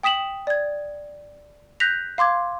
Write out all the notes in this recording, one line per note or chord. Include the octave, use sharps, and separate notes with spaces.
G5 D#6 B6 E7 F#7
D5 G#6
F#6 G6 A#6 B6 F7
F5 C6 D6 G#6